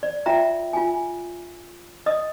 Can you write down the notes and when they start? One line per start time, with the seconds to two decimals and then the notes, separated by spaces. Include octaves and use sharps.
0.03 D5
0.26 F4 E5 G5 A#5
0.73 F4 G#5
2.06 D#5 D#6